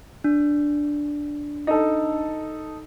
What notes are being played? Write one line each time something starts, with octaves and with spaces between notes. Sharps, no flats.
D4
D#4 A4